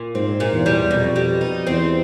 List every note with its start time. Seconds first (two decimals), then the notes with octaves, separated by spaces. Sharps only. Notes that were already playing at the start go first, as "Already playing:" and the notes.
Already playing: A#2
0.14 G#2 C4
0.40 A#2
0.52 E2
0.66 G3
0.90 F2 B2
1.16 G3
1.41 D#4
1.66 E2 C4